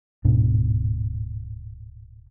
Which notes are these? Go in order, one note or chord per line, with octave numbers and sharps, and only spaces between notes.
D1 G#2 B2 D4